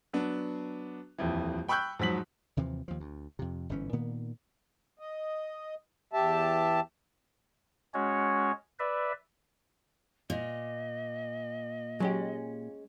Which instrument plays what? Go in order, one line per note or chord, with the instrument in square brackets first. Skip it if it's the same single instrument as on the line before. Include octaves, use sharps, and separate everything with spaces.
[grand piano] F#3 B3 D4
D#1 F2 E3
G5 B5 C#6 E6 F#6 G6
G#2 F3 F#3 B6 F#7
[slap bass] D#2 C3 E3 F3
D#2 F3
D2
F2 C3
G1 G#2 E3 C#4
A#2 D#3 A#3 B3
[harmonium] D#5
E2 G4 E5 A5
[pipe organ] G#3 C#4 F#4 C#5
B4 D5 E5
[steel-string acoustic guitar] A#2 [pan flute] D#5
[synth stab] F#3 G4 [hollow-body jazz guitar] G#3 C#4